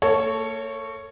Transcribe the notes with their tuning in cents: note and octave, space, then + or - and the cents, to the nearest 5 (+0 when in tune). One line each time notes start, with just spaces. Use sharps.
A#3 -40 A4 +0 C#5 +0